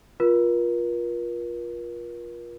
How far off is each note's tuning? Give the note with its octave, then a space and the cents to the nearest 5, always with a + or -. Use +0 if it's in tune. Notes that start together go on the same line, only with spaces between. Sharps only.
F4 +10 A#4 +40